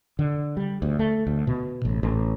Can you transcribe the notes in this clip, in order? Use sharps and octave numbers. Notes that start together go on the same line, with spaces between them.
D3
G3
D2
A3
D2
B2
A1
A1